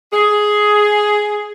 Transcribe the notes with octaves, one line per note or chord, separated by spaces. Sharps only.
G#4